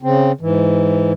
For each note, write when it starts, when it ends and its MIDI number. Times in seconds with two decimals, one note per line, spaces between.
0.03 0.32 49
0.03 0.32 60
0.41 1.13 44
0.41 1.13 52